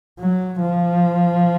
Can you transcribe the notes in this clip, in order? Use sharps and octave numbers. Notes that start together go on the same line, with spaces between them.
F#3
F3